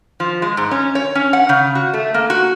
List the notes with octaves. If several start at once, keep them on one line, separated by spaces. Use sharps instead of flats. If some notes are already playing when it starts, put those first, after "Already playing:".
F3
G#3
G#2
C#4
C#5
C#4
F#5
C#3
F#4
A3
A#3
F#4